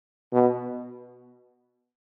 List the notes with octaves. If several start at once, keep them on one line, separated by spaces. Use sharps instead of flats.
B2